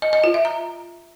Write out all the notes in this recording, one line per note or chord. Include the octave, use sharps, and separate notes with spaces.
D#5
D#5
F4
E5
A#5